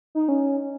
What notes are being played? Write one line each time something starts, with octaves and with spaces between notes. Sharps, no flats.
D#4
C#4